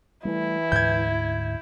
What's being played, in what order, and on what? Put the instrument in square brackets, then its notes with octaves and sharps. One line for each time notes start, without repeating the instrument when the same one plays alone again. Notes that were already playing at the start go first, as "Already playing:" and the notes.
[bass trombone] E3 [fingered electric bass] G3 A3 [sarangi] E4
[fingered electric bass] D2 G#2 [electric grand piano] G6 G#6